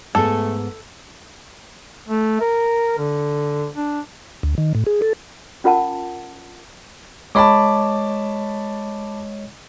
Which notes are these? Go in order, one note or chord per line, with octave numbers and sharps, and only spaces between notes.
G#2 A3 B3 G#4 A4
A3
A#4
D3
D4
D2
D#3
A2
G#4
A4
C#4 F4 A#4 F#5 A5
G#3 C#5 D#5 A5 B5 D6